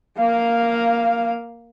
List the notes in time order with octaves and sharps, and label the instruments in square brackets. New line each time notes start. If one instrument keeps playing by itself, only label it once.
[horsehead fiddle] A#3 F5